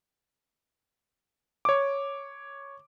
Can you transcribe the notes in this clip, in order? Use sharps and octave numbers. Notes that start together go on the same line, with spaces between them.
C#5 D6